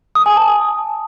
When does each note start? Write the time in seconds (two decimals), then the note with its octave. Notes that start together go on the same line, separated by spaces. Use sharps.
0.15 D#6
0.26 G#5
0.36 A5